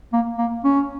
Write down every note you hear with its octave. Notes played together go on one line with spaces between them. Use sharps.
A#3
A#3
C#4